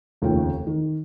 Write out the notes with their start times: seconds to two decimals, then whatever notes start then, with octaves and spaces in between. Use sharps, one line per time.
0.22 F1 D#2 C#3 A3 F4 G5
0.67 D#3